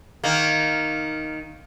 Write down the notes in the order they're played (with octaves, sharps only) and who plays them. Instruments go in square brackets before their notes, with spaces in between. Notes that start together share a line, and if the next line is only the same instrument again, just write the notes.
[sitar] D#3 A#3